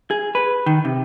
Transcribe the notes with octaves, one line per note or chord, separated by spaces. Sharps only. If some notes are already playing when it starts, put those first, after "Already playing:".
G#4
B4
D#3
C3